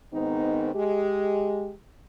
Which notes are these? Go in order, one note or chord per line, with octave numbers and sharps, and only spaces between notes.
G#2 D#3 B3 C4 D#4
G#3 G4